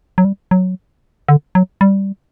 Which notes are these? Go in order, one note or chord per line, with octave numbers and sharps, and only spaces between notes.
F#3
G3
F#3
D3
F#3
G3